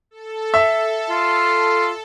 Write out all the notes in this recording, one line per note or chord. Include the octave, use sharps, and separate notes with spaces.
A4
E5
F4